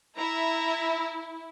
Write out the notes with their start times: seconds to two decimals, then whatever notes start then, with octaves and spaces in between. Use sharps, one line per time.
0.17 E4 E5 A#5